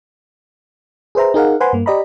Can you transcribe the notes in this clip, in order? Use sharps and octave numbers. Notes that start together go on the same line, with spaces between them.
G#4 B4 C5 E5 A#5
D#4 G#4 A#4 F5 F#5
B4 C5 F#5 G#5 B5 C6
G2 A#3
G4 D5 D#5 A#5 B5